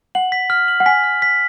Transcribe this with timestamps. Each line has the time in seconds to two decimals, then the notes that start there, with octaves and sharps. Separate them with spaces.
0.15 F#5 F#7
0.32 B6
0.50 F6
0.68 F#7
0.80 F#5
0.86 G#5 B6
1.04 F6
1.22 B6